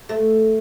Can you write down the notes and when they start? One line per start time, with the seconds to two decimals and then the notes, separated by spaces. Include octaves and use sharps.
0.09 A3